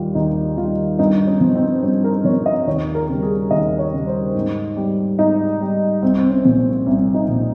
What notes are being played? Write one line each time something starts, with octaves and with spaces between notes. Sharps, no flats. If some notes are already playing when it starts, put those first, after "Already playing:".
Already playing: D#2 D#3 G3 F4
D#2 D#4
D#3 G3 F4
G2 D#4
C#4
F3
C4
G2 C#4
A#4
F3 C#5
D#5
D#2 C#5
A#4
C#3 G3
G#4
D#2 D#5
C#5
C#3 G3
C5
G#2
G3
G#2 D#4
G3
C2 C4
C4
C#4
A#2 F3
C4
C2 C#4
D#4
A#2 F3